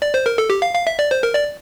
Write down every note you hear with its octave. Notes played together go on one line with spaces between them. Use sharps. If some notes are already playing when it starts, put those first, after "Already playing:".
D5
C5
A#4
A4
G4
F5
F5
E5
D5
C5
A#4
D5